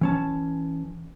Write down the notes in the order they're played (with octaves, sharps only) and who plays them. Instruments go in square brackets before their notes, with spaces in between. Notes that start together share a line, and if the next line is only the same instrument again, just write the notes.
[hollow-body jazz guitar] E3 C#4 A5